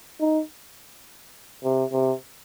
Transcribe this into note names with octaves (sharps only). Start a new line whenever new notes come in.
D#4
C3
C3